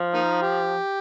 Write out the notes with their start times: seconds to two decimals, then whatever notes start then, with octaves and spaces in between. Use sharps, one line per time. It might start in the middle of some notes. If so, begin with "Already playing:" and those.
Already playing: F3
0.14 A#3 D#4
0.42 G4